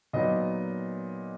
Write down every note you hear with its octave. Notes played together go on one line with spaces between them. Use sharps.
A#2 F#3 B3 D#4 D#5